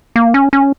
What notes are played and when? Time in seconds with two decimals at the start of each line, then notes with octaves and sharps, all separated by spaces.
0.16 A#3
0.34 C#4
0.53 C#4